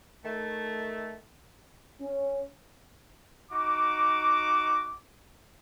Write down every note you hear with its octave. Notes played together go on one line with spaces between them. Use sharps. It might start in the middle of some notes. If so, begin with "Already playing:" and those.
D#3 A3
C#4
D#4 F#4 D6